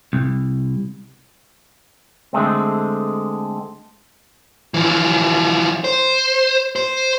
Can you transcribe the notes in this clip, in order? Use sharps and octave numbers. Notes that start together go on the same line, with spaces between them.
C2
D3 G#3 A3 C4
E3 F3
C5
C5